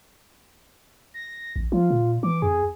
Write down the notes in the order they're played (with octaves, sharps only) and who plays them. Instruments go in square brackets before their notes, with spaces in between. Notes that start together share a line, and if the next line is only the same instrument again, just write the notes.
[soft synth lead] A#6
[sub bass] A1
[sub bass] F3 [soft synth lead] F4
[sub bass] A#2
[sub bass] E3 [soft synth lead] D6
[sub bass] F2 [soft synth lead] G#4